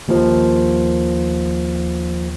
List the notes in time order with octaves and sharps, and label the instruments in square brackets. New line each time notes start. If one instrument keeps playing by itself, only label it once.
[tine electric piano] D#2 F3